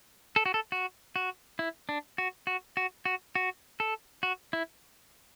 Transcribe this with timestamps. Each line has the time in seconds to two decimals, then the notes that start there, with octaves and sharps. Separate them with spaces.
0.36 A4
0.46 F#4
0.54 A4
0.72 F#4
1.16 F#4
1.59 E4
1.89 D4
2.18 F#4
2.47 F#4
2.77 F#4
3.05 F#4
3.35 F#4
3.80 A4
4.23 F#4
4.53 E4